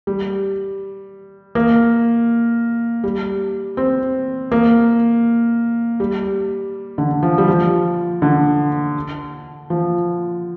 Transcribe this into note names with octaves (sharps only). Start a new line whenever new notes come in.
G3
A#3
G3
C4
A#3
G3
D3
F3
G3
F3
D3
F3